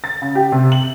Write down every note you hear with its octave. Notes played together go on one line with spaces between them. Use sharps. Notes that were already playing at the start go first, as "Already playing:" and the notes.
A6
C#3
G4
C3
F#7